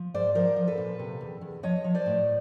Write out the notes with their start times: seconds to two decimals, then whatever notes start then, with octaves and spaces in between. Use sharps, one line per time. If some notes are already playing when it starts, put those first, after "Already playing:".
Already playing: F3
0.14 G#2 C5 D5
0.35 F3 A#4 C5
0.57 F3
0.67 A4 B4
0.78 A#2
0.99 C3
1.21 E2
1.41 E2
1.63 F3 C#5 D#5
1.84 F3
1.95 C5 D5
2.06 A2